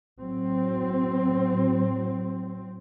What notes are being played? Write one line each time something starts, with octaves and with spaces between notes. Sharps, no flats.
A2 F#3 C4